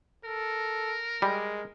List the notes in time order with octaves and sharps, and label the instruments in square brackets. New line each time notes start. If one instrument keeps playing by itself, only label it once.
[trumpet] A4 [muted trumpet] A#4
[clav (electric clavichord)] G3 [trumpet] G#3